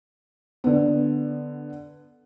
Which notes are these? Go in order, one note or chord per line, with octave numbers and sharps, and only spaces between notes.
D3 B3